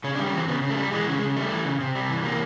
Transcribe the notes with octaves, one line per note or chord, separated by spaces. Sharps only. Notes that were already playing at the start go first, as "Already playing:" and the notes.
C#3 C#4
D4
G3
C#4
E3 C4
C#3 B3
C#3
A3
G3
E3 G#3
C#3
G#3
C#3
G3 A3
E3
C#3
C3
G3
E3
C3 A#3